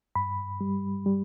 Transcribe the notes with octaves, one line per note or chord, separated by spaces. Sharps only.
G2 B5
G3
G3